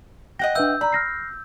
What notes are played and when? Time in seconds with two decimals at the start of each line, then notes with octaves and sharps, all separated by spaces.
0.39 D#5 F#5 G5 A#6
0.55 D4 B4 E5 E6 G6
0.81 D5 A#5 B5
0.92 F6 A#6 C7